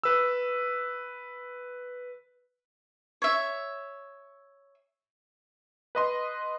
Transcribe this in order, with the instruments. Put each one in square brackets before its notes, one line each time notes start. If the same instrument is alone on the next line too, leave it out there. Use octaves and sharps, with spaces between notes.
[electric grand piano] B4 E6
[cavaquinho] C#5 E5
[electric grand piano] B4 D#5 C6